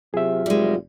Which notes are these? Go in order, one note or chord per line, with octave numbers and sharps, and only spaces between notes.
C3 F#3 F4 G#4 E5
F1 G3 G#3